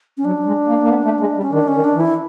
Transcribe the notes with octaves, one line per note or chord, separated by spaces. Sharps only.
C#4
F#3 D4
G#3
A#3
A#3
B3
A3
G#3
G3
C#4
D#3 D4
C#4
D#3
D4
E3
E4